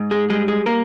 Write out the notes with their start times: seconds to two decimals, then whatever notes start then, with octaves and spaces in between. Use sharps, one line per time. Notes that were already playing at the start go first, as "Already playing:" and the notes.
Already playing: G#2
0.11 G#3 G#4
0.30 G3 G#3 G#4
0.48 G#3 G#4
0.66 A#3 A#4